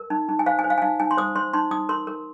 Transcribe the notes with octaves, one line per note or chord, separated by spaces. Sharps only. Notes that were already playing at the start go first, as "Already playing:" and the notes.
Already playing: A#4
D#4
D#4
G#5
C5 F5
G#5
C5
F5
G#5
D#4 F5
D#4 G#5
C6
C5 D#6
C5 C6
D#4 C6
D#4 D#6
A#4 C6
A#4